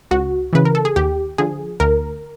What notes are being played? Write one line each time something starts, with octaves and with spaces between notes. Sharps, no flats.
C#2 F#4
C#3 E3 B4
A#4
A4
G#4
D#2 G4
D3 F3 G#4
D2 A#4